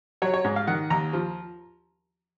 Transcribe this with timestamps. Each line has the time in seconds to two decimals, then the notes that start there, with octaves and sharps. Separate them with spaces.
0.22 F#3 C#5
0.34 C#5
0.44 G#2
0.56 F5
0.67 D#3 F#5
0.90 D#2 A#5
1.13 F3